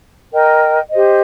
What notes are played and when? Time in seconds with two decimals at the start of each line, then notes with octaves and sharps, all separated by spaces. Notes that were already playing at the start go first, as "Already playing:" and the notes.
0.33 A#4 D#5 G5
0.91 G4 C5 D#5